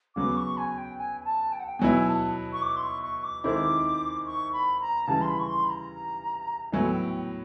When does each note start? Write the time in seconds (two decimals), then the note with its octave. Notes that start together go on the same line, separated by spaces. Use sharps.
0.16 C#3 F#3 B3 D6
0.37 C#6
0.57 G#5
0.78 G5
0.98 G#5
1.20 G#5
1.24 A5
1.52 G5
1.60 F#5
1.66 G5
1.79 B2 F#3 B3 E4 G#5
2.08 A5
2.53 C#6
2.62 D6
2.76 C6
2.82 C#6
3.02 C#6
3.23 D6
3.44 D#3 G#3 C4 E4 D6
4.26 C#6
4.53 B5
4.81 A#5
5.07 C#3 E3 G3 A5
5.21 C6
5.28 B5
5.39 C#6
5.48 C6
5.64 B5
5.70 A#5
6.72 A2 F#3 B3 E4 G#5
6.92 G5